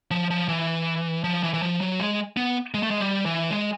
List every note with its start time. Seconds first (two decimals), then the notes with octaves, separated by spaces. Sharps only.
0.11 F3
0.31 F3
0.49 E3
1.24 F3
1.43 E3
1.54 E3
1.62 F3
1.81 F#3
2.00 G#3
2.37 B3
2.74 G#3
2.83 A3
2.91 G#3
3.00 G3
3.26 E3
3.51 G#3